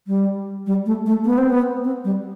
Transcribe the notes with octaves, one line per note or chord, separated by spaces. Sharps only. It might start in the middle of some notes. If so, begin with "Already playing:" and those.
G3
G3
A3
A3
B3
C4
B3
C4
G3